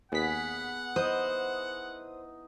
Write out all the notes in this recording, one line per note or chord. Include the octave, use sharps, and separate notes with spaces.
D#2 B3 G#4 F#5 B6
D#4 E4 C5 D#6